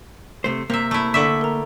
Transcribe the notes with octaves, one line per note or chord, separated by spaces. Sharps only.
C3 A3 C5
C3 A#3 E5
A3 E4
D3 A4 E5 C#6 B6
A#4 A#5